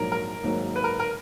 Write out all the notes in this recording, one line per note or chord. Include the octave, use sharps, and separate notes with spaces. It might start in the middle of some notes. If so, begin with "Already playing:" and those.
Already playing: A#1 G#2 F#3 A#4
A#4
G#1 G#2 F#3 A#3
B4
A#4
A#4